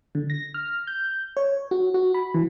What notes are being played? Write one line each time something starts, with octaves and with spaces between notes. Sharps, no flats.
D3
A#6
F6
G6
C#5
F#4
F#4
B5
E3